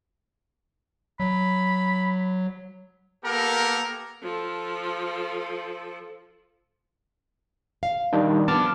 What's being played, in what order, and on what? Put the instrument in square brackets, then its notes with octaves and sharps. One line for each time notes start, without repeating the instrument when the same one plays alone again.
[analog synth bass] F#3 [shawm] B5
[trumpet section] A#3 B3 G4 A4 A#4
[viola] F3 A4
[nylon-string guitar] F5
[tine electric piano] D#3 G3 D4
[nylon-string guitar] F3 B3 [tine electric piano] A5 D6 F6